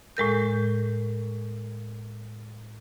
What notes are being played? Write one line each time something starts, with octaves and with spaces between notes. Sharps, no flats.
A2 G#3 A#4 G6